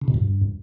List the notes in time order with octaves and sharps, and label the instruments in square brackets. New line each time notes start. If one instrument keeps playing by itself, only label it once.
[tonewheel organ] C#3
B2
G2